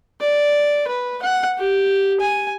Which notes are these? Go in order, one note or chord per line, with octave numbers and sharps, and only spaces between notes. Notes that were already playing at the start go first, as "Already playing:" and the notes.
D5
B4
F#5
G4
G#5